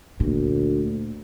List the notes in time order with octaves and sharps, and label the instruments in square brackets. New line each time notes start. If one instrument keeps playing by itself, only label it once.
[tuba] D2 [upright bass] A#2